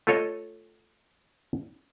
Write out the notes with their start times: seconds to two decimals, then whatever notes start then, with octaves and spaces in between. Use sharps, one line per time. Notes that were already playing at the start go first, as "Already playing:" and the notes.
0.07 A3 F4 A4 C#5 D#5